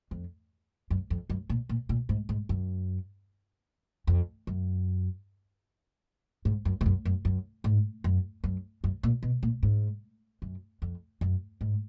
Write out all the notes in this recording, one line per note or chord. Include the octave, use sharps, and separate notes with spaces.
F2
F#2
F2
F#2
A#2
A#2
A#2
G#2
G#2
F#2
F2
F#2
G#2
F#2
G#2
F#2
F#2
F#2
G#2
F#2
F#2
F#2
A#2
B2
A#2
G#2
F#2
F2
F#2
G#2